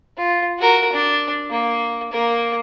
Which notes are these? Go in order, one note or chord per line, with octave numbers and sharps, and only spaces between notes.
F4
F#4 A#4
D4
A#3
A#3 A#4